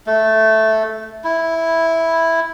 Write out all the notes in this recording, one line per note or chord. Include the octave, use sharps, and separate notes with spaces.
A3
E4